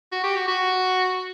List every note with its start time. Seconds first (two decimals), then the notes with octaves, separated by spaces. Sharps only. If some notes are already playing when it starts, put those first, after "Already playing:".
0.12 F#4
0.23 G4
0.36 F#4
0.48 F#4